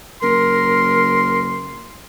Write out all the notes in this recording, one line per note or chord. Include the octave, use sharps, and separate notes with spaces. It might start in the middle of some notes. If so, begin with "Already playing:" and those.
F#1 A#4 C6